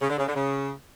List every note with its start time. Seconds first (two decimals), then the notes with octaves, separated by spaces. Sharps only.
0.01 C#3
0.09 D3
0.18 C#3
0.26 D3
0.35 C#3